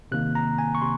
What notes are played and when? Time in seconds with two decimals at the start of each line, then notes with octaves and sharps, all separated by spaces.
0.12 C3 D#3 A#3 F#6
0.35 A#5
0.58 G#5
0.75 C#6
0.81 C3 C6